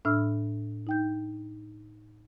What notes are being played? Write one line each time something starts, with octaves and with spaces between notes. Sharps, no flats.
A2 D4 E5 B5 E6 F6
D#4 G5 G6